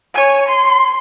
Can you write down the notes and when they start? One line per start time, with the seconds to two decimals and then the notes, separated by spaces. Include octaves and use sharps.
0.14 C#5 G#5
0.48 C6